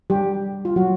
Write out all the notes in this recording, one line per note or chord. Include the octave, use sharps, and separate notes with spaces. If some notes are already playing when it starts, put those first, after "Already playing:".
G3 G4
F4
F#3 F#4